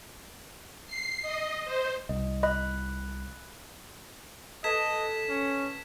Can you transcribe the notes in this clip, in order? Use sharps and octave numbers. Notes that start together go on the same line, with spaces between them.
C7
D#5
C5
C2 D#5
D#5 B5 F#6
A4 B4 D#5 G#6 B6 E7
C#4